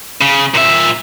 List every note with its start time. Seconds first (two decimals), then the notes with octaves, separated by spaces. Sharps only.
0.21 C#3
0.55 A#2 E5